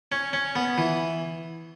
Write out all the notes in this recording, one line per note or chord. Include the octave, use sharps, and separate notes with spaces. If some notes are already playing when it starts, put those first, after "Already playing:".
C#4
C#4
B3
E3